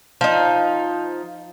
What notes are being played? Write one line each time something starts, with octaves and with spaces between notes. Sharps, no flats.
F3 D#4